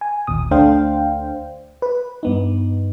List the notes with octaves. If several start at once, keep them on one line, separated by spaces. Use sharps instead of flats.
G#5
G#1 D#2 A#2 D#6
D2 A3 D4 C5 F5 G5
B4
G2 B3 D#4